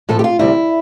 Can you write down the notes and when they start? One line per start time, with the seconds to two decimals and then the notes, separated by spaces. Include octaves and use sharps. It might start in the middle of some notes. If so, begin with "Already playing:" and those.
0.09 A2 F3 A3 A4
0.19 G4
0.24 F4
0.39 D2 C3 G3 C4 E4